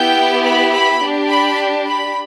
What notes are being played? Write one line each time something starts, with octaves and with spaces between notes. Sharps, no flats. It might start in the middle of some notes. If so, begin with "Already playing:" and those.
Already playing: B3 E4 G4 G5
B5
B5
D4 G4
B5
B5